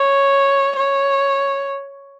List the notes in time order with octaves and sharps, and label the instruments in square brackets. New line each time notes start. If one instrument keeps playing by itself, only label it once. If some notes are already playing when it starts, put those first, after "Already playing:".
Already playing: [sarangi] C#5
C#5